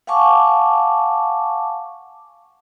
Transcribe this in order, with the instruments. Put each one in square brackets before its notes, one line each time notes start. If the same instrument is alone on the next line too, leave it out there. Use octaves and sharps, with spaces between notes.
[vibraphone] F5 F#5 G#5 A5 C#6 D6